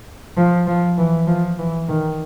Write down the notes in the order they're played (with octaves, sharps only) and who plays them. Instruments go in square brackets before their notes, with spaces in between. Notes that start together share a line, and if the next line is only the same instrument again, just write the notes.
[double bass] F3
F3
E3
F3
E3
D#3